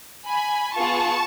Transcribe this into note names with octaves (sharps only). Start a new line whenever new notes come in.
G#5 B5
B3 F4 G#4 A5 C#6